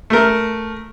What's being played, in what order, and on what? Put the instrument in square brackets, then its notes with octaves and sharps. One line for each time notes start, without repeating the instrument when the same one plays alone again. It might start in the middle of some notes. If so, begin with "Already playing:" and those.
[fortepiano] A3 A#4